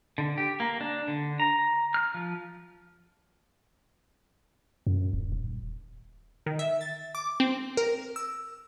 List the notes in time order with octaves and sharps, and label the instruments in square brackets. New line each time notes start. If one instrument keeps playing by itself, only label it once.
[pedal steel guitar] D3
G4
A#3
D4
D3
A#5
F6
F3
[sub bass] F#2
D1
D#1
[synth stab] D#3
E5
A6
D6
C4
A#4
E6